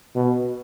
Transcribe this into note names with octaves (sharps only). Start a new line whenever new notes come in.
B2